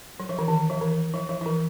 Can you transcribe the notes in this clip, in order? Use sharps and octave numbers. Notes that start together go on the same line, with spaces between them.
F#3
F3
E3
D#3
F3
E3
F3
F3
F3
E3